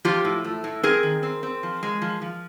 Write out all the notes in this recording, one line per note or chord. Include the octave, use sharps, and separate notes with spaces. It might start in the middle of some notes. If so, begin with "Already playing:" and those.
F3 F4 G4
A2
A3
A2
C4 G#4 A#4
D#3
C4
C4
F3
G#3
F3
F3